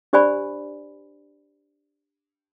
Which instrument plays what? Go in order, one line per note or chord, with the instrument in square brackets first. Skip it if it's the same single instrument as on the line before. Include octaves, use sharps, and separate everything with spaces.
[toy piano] D4 G4 C5 D5 G#5 B5